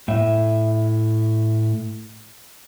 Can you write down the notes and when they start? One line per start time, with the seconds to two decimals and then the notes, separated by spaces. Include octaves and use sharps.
0.08 A2 E5